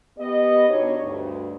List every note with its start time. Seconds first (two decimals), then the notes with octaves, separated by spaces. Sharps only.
0.18 B3 G4 D#5
0.69 B2 D4 D#4 C#5
1.02 D2 G2